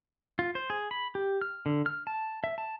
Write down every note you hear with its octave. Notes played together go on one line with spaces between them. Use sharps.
F4
C5
G#4
B5
G4
F6
D3
F6
A5
E5
A5